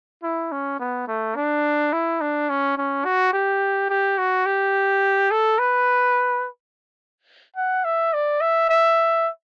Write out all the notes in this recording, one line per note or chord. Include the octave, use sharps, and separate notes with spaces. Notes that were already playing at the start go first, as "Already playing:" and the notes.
E4
C#4
B3
A3
D4
E4
D4
C#4
C#4
F#4
G4
G4
F#4
G4
A4
B4
F#5
E5
D5
E5
E5